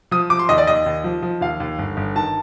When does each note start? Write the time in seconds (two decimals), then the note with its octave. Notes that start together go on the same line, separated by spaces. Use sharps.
0.11 F3 D#6
0.30 F3 D6
0.39 C6
0.49 D#2 D#5
0.58 D5
0.67 D#2 D#5
0.86 D#2
1.04 F3
1.22 F3
1.41 D#2 F5
1.60 D#2
1.79 G1
1.97 G1
2.16 D#3 A5